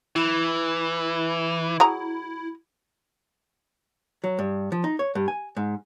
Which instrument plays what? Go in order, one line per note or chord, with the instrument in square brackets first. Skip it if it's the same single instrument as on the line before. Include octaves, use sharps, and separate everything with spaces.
[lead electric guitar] E3 [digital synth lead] E4
[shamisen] F#3 G#4 A#5
[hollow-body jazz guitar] F#3
G2
F3
D#4
C#5
G2
G#5
G#2